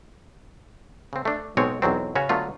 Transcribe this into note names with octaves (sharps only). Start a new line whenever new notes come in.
C#3 C4
A3 D4
B1 B2 G#3 C4 C#5
B1 E2 F#3 C4
C#3 C#4 F#4 C#5
D3 F#3 A3 B3 F4